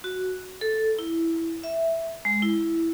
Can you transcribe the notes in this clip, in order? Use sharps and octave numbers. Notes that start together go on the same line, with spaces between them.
F#4
A4
E4
E5
G#3
E4